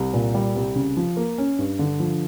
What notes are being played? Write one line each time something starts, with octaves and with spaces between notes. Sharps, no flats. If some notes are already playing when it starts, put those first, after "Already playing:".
Already playing: C2
A#2
G3
C2
C#3
F3
A#3
C#4
G2
D3
F3